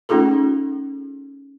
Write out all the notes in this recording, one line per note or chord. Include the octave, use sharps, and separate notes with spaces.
A3 C#4 D#4 F4 G#4 A4